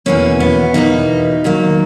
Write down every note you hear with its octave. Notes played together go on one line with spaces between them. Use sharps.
E2 B2 A#3 C#4
B3
E2 B2 A#3 D#4
F#2 D#3 F#3 A#3